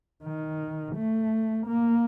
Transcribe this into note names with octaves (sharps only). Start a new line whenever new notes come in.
D#3
A3
A#3